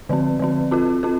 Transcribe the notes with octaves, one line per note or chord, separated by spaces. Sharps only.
D3 F3 C4
D3 F3 C4
C4 F4 A4
C4 F4 A4